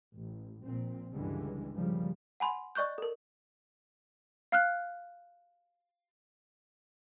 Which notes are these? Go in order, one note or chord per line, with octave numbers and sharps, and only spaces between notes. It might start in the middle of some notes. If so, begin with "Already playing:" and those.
A1
A#1 A#2 C4
C#2 G2 D3 E3 G3 G#3
D#2 C#3 F3 G3
F#5 G#5 B5 C6
D5 D#5 C#6 F#6 G6
A4 A#4
F5 F6 F#6